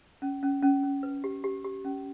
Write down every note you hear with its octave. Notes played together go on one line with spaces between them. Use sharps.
C#4
C#4
C#4
C#4
B4
G4
G4
G4
C#4